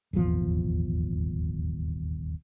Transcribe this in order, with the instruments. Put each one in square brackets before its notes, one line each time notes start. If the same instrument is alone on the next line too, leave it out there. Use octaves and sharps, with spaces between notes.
[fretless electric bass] D#1 G#1 E2 F3